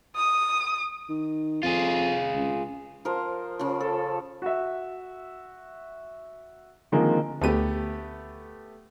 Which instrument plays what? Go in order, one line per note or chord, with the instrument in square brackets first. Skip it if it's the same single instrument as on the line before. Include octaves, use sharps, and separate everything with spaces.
[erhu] D#6
[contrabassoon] D#3
[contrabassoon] F2 [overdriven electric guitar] F4 G#4
[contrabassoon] C#2
[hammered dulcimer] F3 A#4 C5
C#3 F3
A4
[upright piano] F#4 E5
D3 D#3 F3 G#3 A#3 C4
[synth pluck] D2 D#7 [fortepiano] A3 B3 G4